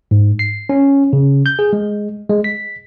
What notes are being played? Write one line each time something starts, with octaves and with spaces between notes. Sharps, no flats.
G#2
C7
C#4
C#3
G6
G#4
G#3
G#3
B6